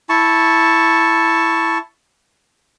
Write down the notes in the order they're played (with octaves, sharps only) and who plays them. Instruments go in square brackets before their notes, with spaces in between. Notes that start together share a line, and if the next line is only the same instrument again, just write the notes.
[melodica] E4 A5 C#6